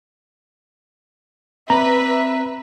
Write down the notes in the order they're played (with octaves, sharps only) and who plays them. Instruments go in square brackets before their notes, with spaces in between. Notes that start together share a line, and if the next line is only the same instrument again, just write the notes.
[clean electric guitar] C4 D5 [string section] B4 [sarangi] E5 [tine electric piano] A#5